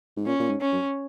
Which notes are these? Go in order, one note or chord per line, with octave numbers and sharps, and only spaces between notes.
G#2
A#2 C#4
A#2
G#2
C#4
F#2